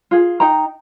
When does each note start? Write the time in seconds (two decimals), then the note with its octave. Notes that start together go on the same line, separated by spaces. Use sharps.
0.11 F4 G#4
0.40 D#4 D#5 G5 A#5